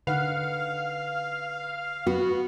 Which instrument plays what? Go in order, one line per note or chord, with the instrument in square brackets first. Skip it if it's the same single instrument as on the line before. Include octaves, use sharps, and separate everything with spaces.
[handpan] D3 D#4 F#5 [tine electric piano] B4 [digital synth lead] F5
[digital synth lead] B3 [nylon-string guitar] F#4